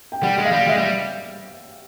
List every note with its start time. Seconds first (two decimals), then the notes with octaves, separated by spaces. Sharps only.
0.12 G5
0.22 G3 F#5
0.38 G#3
0.45 F5
0.52 G3
0.67 G#3 E5
0.78 G3